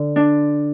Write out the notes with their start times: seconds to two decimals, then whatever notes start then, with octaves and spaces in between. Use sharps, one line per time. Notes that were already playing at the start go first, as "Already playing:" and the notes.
Already playing: D3
0.16 D4